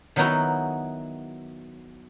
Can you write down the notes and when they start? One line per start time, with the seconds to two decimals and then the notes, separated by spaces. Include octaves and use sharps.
0.16 D#3 F#3 B3 D#4 E4 F#4